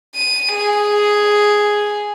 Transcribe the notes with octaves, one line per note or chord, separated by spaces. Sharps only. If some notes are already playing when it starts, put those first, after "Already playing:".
D#7
G#4